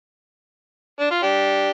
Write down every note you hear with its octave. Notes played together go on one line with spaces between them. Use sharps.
D4
F4
D4 G4